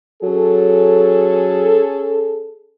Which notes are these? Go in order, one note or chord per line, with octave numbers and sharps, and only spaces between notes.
F#3 C#4 G#4 A4